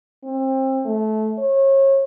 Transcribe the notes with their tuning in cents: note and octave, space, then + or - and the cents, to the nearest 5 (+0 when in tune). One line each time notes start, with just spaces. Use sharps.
C4 +30
A3 -20
C#5 -30